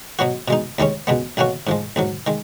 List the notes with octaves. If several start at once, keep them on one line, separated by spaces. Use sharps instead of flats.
B2 F#3 B3 F#4
B2 G#3 D#4
D#2 D#3 G#3 C#4
C#2 B2 G#3 B3
B1 B2 A#3 C#4 F#4
G#2 F3 G#3
A#1 G#2 F#3
D#3 G#3